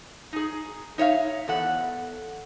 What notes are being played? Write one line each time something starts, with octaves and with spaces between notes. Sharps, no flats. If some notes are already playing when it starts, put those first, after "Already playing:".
D#4 G#4
D#4 C#5 E5 F5
E2 A4 F#5